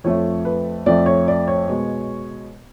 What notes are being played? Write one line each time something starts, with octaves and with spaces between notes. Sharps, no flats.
F2 F3 A3 C#5
B4
F2 F3 A3 D5
C#5
D5
C#5
B2 G#3